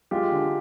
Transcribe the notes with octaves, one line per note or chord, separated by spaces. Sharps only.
G#3 F4 G4
D3